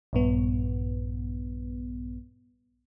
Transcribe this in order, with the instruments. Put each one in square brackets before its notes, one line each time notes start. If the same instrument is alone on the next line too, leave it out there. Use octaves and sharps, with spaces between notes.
[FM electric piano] A#1 G2 B3